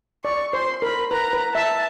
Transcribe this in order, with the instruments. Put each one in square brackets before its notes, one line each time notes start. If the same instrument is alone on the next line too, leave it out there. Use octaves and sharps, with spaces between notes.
[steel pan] D5 [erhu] C#6
[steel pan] C5 [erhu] C6
[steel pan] A#4 [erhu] B5
[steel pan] B4 [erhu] A#5
[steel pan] B4
[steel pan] E5 [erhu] A5